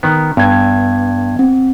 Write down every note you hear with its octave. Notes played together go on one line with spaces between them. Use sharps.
D#3 B3
G2 B3 G#6
C4